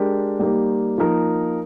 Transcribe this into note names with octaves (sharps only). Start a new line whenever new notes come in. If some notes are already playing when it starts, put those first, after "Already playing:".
Already playing: G#3 D4 G4 A#4
G3 A#3 D#4 G4
F3 A#3 D#4 A#4